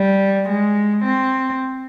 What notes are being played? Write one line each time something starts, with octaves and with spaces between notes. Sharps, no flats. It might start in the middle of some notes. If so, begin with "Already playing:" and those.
Already playing: G3
G#3
C4